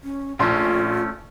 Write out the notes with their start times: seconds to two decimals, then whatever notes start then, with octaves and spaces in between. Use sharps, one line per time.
0.03 C#4
0.39 A#1 A3 C#4 F4 C6